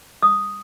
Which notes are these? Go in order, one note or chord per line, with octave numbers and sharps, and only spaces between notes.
D#6